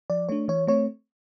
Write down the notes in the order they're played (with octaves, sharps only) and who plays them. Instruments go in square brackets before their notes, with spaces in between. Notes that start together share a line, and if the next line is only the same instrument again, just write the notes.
[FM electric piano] F3 D5
A3 D4 C#5
E3 C#5
A3 C4 C#5